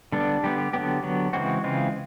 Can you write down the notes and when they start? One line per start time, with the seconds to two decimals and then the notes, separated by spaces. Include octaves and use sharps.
0.12 D3 G3 B3 D4
0.43 D3 G3 B3 G4
0.58 G4
0.73 D3 F#3 B3 G4
1.03 D3 F#3 B3
1.33 C#3 E3 G#3 C4 F#4
1.64 C#3 E3 G#3 C4 F4